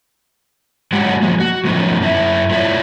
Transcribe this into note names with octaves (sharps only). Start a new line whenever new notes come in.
F#3 G#3 C#4 F#4 G4
F3 G#3 A#3
F#4
F3 F#3 A3 B3 C#4 D#4
F#2 E4 E5
E4 F4 A4 C#5 D5 E5